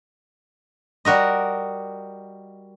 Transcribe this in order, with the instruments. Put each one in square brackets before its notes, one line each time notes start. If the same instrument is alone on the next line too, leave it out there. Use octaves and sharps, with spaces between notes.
[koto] G3 F#4 A#4 D#5